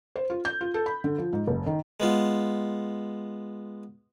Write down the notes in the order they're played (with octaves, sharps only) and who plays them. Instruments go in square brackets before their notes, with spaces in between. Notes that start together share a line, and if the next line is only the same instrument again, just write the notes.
[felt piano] C5
F4
G6
F4
A4
B5
D3
F3
G#2
F#1
D#3
[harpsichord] G#3 B3 F4